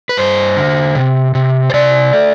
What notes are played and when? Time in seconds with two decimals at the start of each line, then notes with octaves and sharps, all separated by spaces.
0.09 B4
0.17 G2 C5
0.57 D3
0.95 C3
1.35 C3
1.70 C5
1.74 C3 D5
2.13 A3